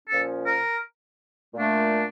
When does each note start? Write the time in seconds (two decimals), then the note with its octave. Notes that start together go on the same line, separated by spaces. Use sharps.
0.08 A#2 F3 C#4 A4
0.45 A#4
1.53 A#2 A3 D4